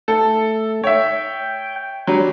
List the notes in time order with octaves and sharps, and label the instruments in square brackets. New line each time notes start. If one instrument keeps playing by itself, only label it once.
[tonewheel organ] A3 [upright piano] A4
[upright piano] C#5 E5 [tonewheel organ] G5
[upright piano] F#3 G3 [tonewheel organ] D4